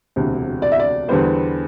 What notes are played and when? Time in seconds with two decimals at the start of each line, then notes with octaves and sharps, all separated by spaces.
0.16 E1 D2 C3
0.62 D5
0.72 E5
0.80 D5
1.08 E2 D3 G3 B3 C5